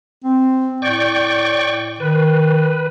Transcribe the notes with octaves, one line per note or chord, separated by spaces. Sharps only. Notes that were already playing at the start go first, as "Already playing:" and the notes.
C4
A2 D5 G5 C#6
D#3 B4